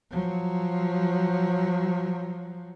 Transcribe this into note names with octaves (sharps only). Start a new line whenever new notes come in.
F3 F#3